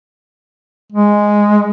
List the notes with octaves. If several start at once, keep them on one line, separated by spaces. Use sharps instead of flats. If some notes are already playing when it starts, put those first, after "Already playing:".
G#3